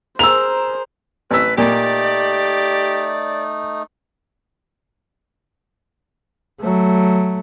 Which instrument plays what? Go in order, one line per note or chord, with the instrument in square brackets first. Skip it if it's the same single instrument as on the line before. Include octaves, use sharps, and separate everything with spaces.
[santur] G#4 A#4 [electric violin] C5 [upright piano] E6 F7
[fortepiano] A1 E6 [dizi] B4
[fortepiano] A#2 [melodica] A3 D#4 [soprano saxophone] G4 [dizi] D5
[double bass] F#3 A3